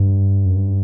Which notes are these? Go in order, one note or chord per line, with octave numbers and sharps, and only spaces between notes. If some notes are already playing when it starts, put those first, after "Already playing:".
Already playing: G2
F#2
G2